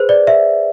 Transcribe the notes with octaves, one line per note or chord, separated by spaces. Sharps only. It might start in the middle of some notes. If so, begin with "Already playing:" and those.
Already playing: G#4 B4 C5
D5
E5